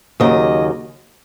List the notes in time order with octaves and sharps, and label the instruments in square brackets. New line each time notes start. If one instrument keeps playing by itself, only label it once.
[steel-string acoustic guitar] D#2 C#3 F#3 D#5